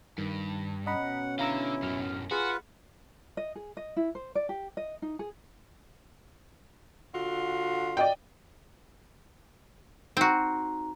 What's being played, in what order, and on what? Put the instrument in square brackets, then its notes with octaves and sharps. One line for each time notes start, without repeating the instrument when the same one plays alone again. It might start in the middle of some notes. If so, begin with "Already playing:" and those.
[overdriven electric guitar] G2 [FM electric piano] D#3
[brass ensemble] B2 C#4 [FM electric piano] D#5 A#5 B5 [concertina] F#5
[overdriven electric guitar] D3 [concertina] E4 [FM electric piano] F5 A#5 E6
[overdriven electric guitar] F#2 A2 [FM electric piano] F#3 F6
[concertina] F4 B4 [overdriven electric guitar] F#4 [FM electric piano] G#4
[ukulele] D#5
G#4
D#5
E4
C5
D5
G4
D#5
D#4
G#4
[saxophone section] D3 F4 F#4
[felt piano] D5 D#5 G5
[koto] C4 F#4 [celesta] D#4 A#5